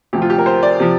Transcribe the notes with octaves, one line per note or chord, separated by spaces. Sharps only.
D2 C3 F3 G4
F4
G4
A#4
C5
D5
C3 F3